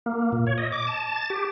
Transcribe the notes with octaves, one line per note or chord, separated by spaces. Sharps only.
A#3
A#2
C#5
D#5
D6
A5
A6
G4